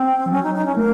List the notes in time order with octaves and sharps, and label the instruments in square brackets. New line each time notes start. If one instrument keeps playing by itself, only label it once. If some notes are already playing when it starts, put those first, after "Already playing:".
Already playing: [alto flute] C4
[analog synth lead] F3
[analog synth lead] F#3 [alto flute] C#4
[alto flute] D#4
D#4
C#4
[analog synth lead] A3 [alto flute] A#4